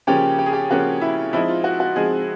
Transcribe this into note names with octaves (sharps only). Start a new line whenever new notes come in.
C#3 F3 A#3 C#4 G4
G4
G#4
G4
C#3 F3 A#3 C#4 F#4
E4
F3 G#3 C4 D#4 E4
F4
F#4
F#4
F3 G#3 C4 D#4 G#4